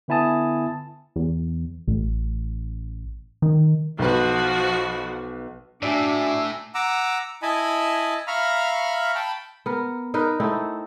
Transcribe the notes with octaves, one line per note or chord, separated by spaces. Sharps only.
D3 B3 E4 G#5 A5 D#6
E2
A1
D#3
B1 F3 F#4 B4
A2 D4 F#4 D5 E5 G#5 E6
F#5 A#5 D6 E6
E4 D#5 G#5 A5 B5
E5 F5 A#5 B5 C#6 F6
G5 A5 B5
B3 A#4
D#4 A#4 B4
A3 C4 D#4 E4